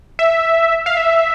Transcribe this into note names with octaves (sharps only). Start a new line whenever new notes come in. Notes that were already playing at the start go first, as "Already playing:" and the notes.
E5
F5
E5